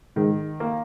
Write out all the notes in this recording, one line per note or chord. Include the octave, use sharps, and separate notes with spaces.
G#2 D#3
A#3